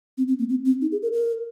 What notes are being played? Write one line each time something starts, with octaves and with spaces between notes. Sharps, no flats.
C4
C4
A#3
C4
C4
D#4
G#4
A#4
A#4